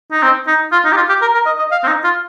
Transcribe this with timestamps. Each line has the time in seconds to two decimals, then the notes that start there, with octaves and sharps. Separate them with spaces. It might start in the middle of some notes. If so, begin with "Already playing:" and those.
0.12 D#4
0.23 C4
0.47 D#4
0.72 F4
0.85 D#4
0.93 G4
0.97 F4
1.09 G4
1.22 A#4
1.34 A#4
1.46 D#5
1.59 D#5
1.72 F5
1.84 C4
1.88 D#4
2.04 F4